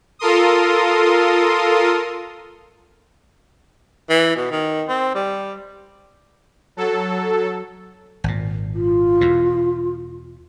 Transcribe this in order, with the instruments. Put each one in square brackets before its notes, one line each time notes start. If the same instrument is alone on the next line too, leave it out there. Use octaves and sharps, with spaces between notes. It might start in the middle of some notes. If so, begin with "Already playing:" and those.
[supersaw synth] F4 A4 A#4 C6 D#6
[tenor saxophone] E3
B2
D#3
C4
G3
[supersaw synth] F#3 A4
[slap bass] G#1 A#2
[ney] F4
[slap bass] E2 B2